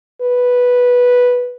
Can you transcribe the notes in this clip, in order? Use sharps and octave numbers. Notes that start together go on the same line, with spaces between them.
B4